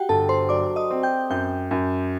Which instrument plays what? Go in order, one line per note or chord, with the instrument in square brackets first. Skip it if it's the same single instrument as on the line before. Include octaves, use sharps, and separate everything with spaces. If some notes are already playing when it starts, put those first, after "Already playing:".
Already playing: [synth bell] F#4 G4 F#5 G5
[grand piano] G1 [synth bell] A4 A5
[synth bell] C5 C6
[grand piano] F#3 [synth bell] D5 D6
[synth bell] D#5 D#6
[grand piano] C4
[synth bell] G5 G6
[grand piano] F#2 [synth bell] G5 G6
[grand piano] F#2